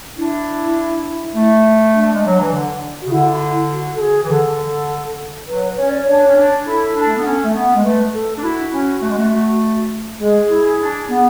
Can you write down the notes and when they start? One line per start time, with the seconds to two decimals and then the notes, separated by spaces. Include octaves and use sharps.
0.16 D4 E4
1.35 A3
1.93 D4
2.00 A3
2.13 G#3
2.26 F#3
2.40 E3
2.53 D3
3.02 C#3 F#4
3.11 D3 E4
3.71 F#4
3.96 A4
4.00 G#4
4.24 E3
4.30 D3 A4
5.48 F#3 B4
5.77 C#4 C#5
5.90 D5
6.02 D4 C#5
6.26 C#4
6.36 D4
6.66 E4 A4
6.95 D4
7.06 A3
7.15 B3
7.25 C#4
7.43 A3
7.54 B3
7.76 G#3
7.84 A3 B4
8.13 A4
8.37 D4
8.43 E4 F#4
8.73 C#4
9.02 A3
9.10 G#3
9.18 A3
10.20 G#3 G#4
10.50 E4
10.80 D4
11.09 B3